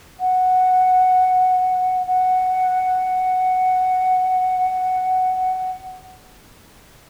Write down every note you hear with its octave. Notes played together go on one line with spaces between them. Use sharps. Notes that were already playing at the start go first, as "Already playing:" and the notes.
F#5
F#5